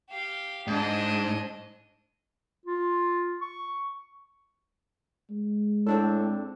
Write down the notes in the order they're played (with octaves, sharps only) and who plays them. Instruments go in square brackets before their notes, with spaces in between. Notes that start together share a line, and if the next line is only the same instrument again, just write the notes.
[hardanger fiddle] G4 F5
[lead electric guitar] G#2 [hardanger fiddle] D4 D#5
[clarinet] F4
C#6
[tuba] G#3
[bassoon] A2 [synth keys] C4 D4 A4